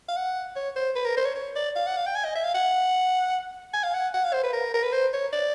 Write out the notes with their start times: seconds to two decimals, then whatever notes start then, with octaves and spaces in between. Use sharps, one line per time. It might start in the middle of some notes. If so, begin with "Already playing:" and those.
0.08 F5
0.16 F#5
0.56 C#5
0.76 C5
0.96 B4
1.05 A#4
1.17 C5
1.25 C#5
1.35 C#5
1.56 D5
1.76 F5
1.86 F#5
1.97 F5
2.06 G5
2.15 G#5
2.25 D#5
2.35 E5
2.44 F5
2.55 F#5
3.73 G#5
3.83 F5
3.94 F#5
4.14 F#5
4.24 F5
4.33 C5
4.44 B4
4.53 A#4
4.74 A#4
4.83 B4
4.93 C5
5.13 C#5
5.33 D5